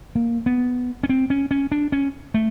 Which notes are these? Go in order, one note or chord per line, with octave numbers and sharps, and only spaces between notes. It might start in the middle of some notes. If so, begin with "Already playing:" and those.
A#3
B3
C#4
C4
C#4
C#4
D4
C#4
A3